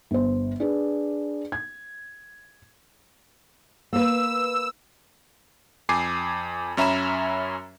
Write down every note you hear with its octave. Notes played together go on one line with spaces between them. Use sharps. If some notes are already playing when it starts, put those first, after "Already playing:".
G1 C5
D4 G#4 B4
G#6
A#3 B4 E6
F2 G#5 D6 C7
F#2 C#4 E5 A#5 B5 E7